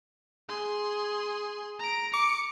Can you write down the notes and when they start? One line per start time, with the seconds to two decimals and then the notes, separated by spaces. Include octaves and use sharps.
0.49 G#4 C6
1.79 A#5 D7
2.13 D6 C#7